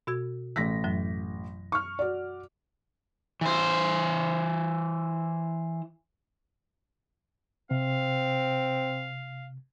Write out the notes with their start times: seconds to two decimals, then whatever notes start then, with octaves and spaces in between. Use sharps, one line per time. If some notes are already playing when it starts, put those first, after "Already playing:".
0.07 B2 F#4 G#6
0.56 A1 E3 A#6 B6
0.84 F#2 F#3
1.72 C#6 F6
1.99 F#4 D5
3.41 E3 C5
7.71 C3 C4 F5